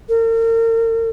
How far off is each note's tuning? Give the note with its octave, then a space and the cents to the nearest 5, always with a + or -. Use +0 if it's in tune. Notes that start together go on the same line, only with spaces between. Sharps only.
A#4 -40